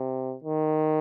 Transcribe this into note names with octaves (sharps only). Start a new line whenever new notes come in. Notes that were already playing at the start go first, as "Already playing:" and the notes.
Already playing: C3
D#3